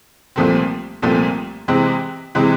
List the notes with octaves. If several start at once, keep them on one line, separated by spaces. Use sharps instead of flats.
C2 A#2 F3 A3 C4
C2 A#2 F3 A3 C4
C3 E3 G#3 C4
C3 E3 G#3 C4